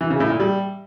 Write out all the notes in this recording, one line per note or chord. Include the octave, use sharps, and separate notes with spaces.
E3
C#3
A2
A#2
G3